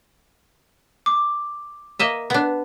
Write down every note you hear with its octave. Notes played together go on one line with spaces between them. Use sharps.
D6
A#3 D#5 E5
B3 D4